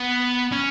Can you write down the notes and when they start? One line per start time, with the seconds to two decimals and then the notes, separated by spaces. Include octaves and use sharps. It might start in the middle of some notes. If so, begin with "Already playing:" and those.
Already playing: B3
0.52 C#4